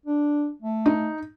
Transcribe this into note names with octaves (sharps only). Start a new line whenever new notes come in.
D4
A3
D#4